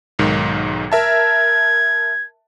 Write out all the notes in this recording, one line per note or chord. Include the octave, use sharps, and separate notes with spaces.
B1 G#2 D#3
A#4 E5 A5 G#6